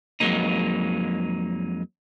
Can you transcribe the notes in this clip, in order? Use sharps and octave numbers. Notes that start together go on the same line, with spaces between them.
F2 F#3 G#3 A#3 D#4